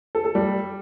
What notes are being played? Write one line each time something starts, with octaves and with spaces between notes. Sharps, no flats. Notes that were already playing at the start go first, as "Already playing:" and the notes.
A4
A4
G3